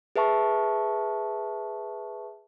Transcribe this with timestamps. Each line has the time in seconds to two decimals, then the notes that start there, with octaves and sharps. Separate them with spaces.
0.16 G#4 B4 E5 A5 C#6